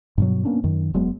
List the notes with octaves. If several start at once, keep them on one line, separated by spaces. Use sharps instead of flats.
G2 B2 F#3
A#3 B3 C#4 D4
F#2 D#3
E1 F#3 G#3 B3